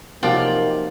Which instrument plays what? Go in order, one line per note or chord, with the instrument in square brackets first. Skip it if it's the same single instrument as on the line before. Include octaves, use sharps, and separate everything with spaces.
[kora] C3 F3 F#3 [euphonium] A#3 [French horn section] D#4 [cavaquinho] F4 D5 G5